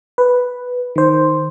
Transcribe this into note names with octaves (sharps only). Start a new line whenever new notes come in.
B4
D#3 C5